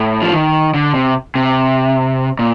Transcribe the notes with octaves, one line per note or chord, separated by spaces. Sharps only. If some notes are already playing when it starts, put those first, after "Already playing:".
Already playing: A2
F3
D#3
D3
C3
C3
A#2